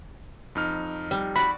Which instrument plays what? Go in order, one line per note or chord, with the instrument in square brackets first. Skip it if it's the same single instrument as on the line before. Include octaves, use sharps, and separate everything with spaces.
[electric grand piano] F2 D#4 F6
[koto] G3
[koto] F#4 D5 [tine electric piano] B5